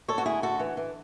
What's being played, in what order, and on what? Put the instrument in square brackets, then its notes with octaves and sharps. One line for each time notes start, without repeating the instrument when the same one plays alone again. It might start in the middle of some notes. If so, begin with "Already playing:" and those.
[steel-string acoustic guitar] D2 A4 C#5
F#4
D2 E4 G#4
D2 F#4 A4
E3
E3